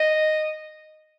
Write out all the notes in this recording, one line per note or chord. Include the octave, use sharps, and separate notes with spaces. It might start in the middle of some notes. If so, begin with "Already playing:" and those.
Already playing: D#5